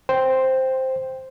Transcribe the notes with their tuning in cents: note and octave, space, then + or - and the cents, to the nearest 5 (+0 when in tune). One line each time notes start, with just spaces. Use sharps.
C5 +0 G5 +0